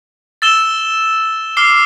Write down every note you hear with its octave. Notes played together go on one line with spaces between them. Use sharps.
E6 A6 E7 G7
D6 F6 C7 G7